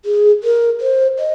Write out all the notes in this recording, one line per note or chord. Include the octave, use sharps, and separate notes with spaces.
G#4
A#4
C5
D#5